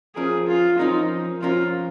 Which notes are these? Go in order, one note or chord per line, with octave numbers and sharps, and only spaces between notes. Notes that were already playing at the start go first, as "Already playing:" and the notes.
F3 C#4 G#4 A#4
F4
F3 C#4 D#4 A#4
F3 C#4 F4 A#4